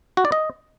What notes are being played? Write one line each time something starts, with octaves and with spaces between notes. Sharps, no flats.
F#4
D5
D#5